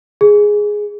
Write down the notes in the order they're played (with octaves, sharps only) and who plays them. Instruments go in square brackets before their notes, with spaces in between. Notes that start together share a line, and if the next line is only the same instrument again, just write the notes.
[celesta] G#4